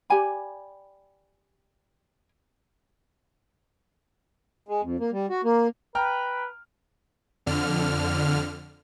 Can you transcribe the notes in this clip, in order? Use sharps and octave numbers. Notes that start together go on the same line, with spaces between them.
G4 D5 G#5 B5
G#3
F2
A#3
G3
F#4
A#3
B4 G5 A#5 F6
F2 D3 F6